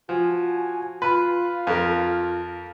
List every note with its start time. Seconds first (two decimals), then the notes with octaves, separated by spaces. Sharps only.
0.09 F3 F#4 G#5
1.02 F4 B4
1.67 F2 A#4